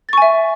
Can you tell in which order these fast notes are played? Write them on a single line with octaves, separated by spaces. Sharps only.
A6 C#6 G#5 E5